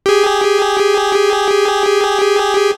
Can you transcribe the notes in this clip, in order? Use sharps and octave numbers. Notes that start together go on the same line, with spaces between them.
G4 G#4